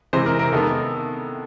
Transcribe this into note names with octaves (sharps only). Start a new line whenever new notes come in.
C3 E3 G#3 C5
A#4
A#4
D#3 G#3 B3 A4